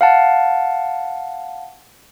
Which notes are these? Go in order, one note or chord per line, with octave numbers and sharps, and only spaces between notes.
F5 F#5 A5